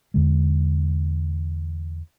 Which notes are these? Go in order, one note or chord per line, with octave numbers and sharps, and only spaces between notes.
E2 D3 G#3